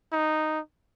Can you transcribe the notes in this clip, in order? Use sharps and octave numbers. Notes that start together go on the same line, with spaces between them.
D#4